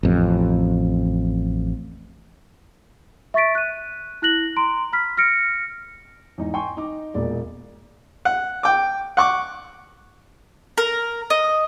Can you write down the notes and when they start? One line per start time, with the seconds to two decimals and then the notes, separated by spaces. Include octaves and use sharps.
0.03 A1 F2
3.34 E5 C#6 A6 B6 D7
3.55 F#6 D#7
4.22 E4 F#6 A#6 F#7
4.56 A#5 C6 D7
4.93 B5 F6 B6
5.17 F6 A#6 C#7 D7
6.38 E2 G#2 D#4
6.54 G5 G#5 C6 C#6
6.77 D#4 D6
7.14 E1 A#2 G#3 D5
8.25 F#5
8.63 G5 D6
9.17 F#5 C#6 D6
10.78 A#4
11.30 D#5